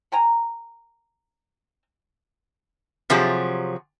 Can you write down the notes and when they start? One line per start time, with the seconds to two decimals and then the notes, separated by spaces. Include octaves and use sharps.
0.12 A#4 G5 G#5 A#5
3.10 C3 F3 F#3 G4 G#4